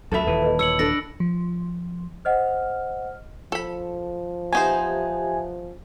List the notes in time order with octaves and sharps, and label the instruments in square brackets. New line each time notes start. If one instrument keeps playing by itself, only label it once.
[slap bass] D2 F3 F#3 [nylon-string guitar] A4 E5 [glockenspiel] A5 B5
[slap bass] D#1 D#2 E3 [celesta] B4 D#7
[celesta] B4 D#5
[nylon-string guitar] C#5 [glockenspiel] E6 C#7 F#7
[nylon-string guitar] D4 A4 [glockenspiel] A#6
[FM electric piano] F3
[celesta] C5 D#5 F#5 [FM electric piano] F6
[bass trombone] F3 [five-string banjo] A4 B5
[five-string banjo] B3 D#4 C5 [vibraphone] G4 D#5 E5 [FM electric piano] G#5